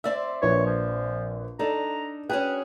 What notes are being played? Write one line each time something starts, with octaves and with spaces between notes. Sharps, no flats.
C4 D5 E5 E6
A#1 B4 C#5
F3
D4 D#4 A4 A#5
C#4 F#4 G#4 B4 G5